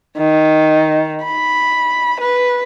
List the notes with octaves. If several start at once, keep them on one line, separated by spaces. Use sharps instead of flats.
D#3
B5
B4